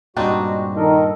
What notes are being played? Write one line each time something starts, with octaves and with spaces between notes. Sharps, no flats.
G2 A#2 G3 G#3 C4 D4 D#4 F#4
D#3 A4 A#4 D#5